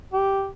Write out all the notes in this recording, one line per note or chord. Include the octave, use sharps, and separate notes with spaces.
G4